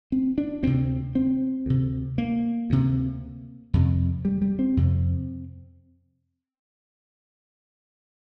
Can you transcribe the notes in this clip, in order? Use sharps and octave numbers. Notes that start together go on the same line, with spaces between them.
C4
D4
D2 C3 C4
C4
D2 C3
A#3
D2 C3
F2 C3
G3
G3
C4
F2 C3